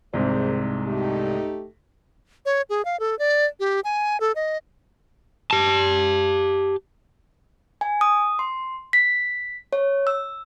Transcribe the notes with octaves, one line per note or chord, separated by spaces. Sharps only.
C2 G#2 C3 D#3 G#4 C5
A3 D#4 G4
C#5
G#4
F5
A4
D5
G4
G#5
A4
D#5
G4 A5
G#5
D#6
C6
B6
C#5
E6